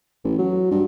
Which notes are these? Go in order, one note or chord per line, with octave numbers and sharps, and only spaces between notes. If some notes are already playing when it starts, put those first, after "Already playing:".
A1
F#3
G2